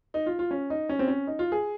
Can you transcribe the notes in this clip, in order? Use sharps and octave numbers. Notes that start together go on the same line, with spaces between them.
D#4
F4
F4
C#4
D#4
C#4
C4
C#4
D#4
F4
G#4